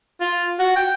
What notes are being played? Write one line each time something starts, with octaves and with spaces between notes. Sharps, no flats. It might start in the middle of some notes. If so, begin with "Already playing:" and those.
F4
F#4
G5